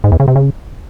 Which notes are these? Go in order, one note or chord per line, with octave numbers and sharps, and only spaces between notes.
G#2
E2
C#3
C3
C#3